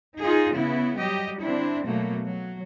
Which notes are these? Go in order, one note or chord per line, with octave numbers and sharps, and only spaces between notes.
D#4 F4 G#4
C#3 B3 E4
F#3 G3 G4 D#5
D3 C4 D4 E4
B2 F#3 A3 A#3
F#3